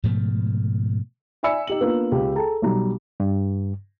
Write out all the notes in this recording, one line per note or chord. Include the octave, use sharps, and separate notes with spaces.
G#2 B2 F3 A3
D5 E5 G#5 B5 E6 C#7
D#4 G4 F#7
A#3 B3 D4 F4 B4
C#2 G4
G#4 A4 G5 A5 A#5
B1 G3 A#5
G2